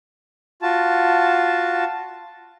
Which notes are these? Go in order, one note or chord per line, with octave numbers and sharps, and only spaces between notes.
F4 F#4 A5